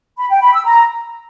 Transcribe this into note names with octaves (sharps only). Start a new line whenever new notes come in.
B5
G5
B5
E6
A#5